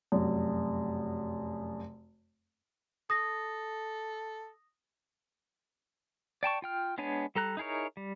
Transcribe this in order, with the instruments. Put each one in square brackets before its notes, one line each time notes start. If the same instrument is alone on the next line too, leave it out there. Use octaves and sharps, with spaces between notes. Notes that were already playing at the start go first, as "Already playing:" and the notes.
[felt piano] F1 F#2
[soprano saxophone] A4 [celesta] D#6 A#6
[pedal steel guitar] D5 G5 A5 C#6
F4 G5 F6
G#3 B3 D4 C#5 G#5
G3 A4 A#5 F#6
D#4 E4 G#4 A#4 C#5
G3